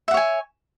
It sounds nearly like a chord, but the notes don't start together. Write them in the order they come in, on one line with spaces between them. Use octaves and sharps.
E5 F#5 C#5 G#5